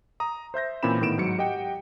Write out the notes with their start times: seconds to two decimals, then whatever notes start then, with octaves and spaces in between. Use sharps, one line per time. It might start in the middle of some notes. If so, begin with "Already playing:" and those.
0.20 A#5 D#6
0.54 C5 E5 G6 A#6
0.83 A#2 E3 C4 C#4 B5 E7
1.01 A2 D#3 B3 D7 E7
1.18 G#2 F#3 C#7
1.38 G4 D#5 F#5 G5